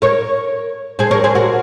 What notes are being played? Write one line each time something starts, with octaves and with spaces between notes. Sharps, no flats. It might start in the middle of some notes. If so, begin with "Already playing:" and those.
A#4 C#5
G#4 C5
A#4 C#5
G#4 C5
F#4 A#4